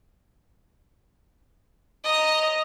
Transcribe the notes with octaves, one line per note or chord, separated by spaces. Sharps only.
D#5 A#5